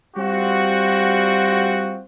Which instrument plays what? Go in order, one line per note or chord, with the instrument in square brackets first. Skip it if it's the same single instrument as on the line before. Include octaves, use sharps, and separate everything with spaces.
[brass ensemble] G3 C4 F4 F#4